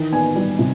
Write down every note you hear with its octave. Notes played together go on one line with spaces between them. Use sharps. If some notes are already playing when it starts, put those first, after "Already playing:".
Already playing: D#3 E3
B3 G#5
G3
C3